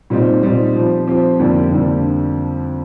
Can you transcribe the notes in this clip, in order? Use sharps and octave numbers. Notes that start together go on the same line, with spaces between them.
A#2 G3 C4 D#4
A#2 G3 C4 D#4
F3 C4 G4
F3 C4 G4
F2 D3 G3 A#3 D4
F2 D3 G3 A#3 D4